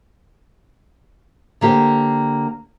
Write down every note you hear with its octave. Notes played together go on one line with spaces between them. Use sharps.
D3 A#3 G4 C5